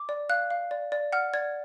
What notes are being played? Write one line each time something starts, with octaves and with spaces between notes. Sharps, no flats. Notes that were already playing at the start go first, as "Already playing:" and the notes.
Already playing: D6
D5
F5 F#6
F5
D5
D5
F#5 F6
D5 G#6